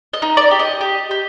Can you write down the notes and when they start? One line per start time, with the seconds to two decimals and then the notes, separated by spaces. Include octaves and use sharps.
0.13 D#5
0.22 D#4
0.37 D5
0.51 G4
0.59 D#5
0.81 G4
1.11 G4